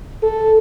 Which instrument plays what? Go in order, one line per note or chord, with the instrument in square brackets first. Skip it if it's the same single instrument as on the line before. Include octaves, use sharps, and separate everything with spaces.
[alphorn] A4